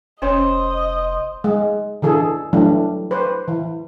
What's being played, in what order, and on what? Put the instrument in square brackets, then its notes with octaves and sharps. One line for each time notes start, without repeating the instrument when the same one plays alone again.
[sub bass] F1 [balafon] C#4 C#5 [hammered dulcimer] C5 [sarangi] D#5
[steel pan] G#3
D3 E3 G#4 A4
E3 F#3 G3 A3 D4
B4 C5
E3